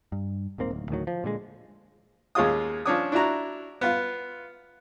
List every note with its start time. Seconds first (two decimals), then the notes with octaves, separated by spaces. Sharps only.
0.12 G2
0.58 D#1 G#2 A#3 C4
0.71 D1 D#2
0.89 D2 A2 D#3 F#3
1.07 F3
1.24 A#2 D3 G3 G#3
2.35 D#2 G#3 C#4 F4 D#6
2.85 F3 C#4 D4 C#5 D6 D#6
3.12 D4 E4 F#4 A#5
3.81 B3 F4